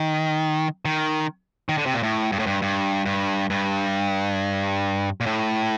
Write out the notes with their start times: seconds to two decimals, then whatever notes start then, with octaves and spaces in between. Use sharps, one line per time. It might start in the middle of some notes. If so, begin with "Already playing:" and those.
Already playing: D#3
0.85 D#3
1.69 D#3
1.78 D3
1.86 C3
1.94 A#2
2.03 A2
2.32 G2
2.39 A2
2.46 G2
2.62 G2
3.05 G2
3.50 G2
5.21 A#2
5.26 A2